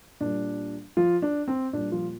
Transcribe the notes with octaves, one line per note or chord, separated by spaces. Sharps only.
A#2 G3 D4
F3 F4
D4
C4
A#2 G3 D4
F3 F4